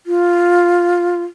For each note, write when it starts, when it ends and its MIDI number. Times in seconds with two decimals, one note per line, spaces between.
0.06 1.23 65